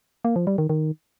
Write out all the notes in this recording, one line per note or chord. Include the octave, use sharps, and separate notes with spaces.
A#3
F3
G3
D#3
D#3